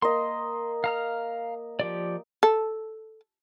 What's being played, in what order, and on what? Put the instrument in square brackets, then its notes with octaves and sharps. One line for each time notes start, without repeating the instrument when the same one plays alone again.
[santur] A#3 D#5 [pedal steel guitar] C6
[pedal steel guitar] F5 A#5 F6
F3 G4 D5
[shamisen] A4